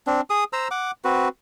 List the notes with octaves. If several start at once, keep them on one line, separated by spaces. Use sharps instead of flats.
C4 D4
G#4 D#6
C5 A#5 E6
F#5 D6
C4 F#4 B4